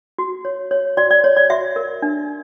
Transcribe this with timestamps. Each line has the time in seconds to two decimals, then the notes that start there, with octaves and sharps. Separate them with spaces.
0.18 F#4
0.45 C#5
0.71 C#5
0.97 F#4 D5
1.11 D5
1.24 C#5
1.37 D5
1.50 F#4 E5
1.76 A#4
2.02 D4